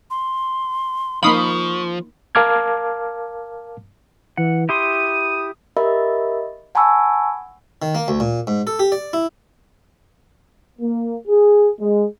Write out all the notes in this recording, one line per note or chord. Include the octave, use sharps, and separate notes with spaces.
C6
F3 A#3 D#4 F5 B5 C#6 D#6
A#4 F5 A5 D6 F6 G#6
E3 F#5
E4 G4 C6 D#6 D#7
G4 A#4 D#5 E5 B5
F#5 G#5 A5 B5 C#6 E6
D#3
A#3
D2
A#2
G#2
A4
G4
D5
E4
A#3
G#4
G#3